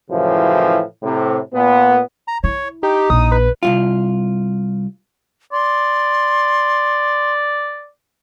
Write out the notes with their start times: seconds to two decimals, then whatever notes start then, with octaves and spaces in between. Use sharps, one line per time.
0.11 F#2 A2 C#3 E3 F3
1.03 A2 C3
1.53 A#2 B3
2.28 A#5
2.44 E4 C#5
2.83 D#4 G4
3.10 A#1 D#6
3.32 B4
3.63 C2 F#2 F4
5.52 D5 C6